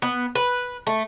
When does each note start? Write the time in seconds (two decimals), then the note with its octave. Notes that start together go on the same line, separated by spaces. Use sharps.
0.02 B3
0.35 B4
0.87 A3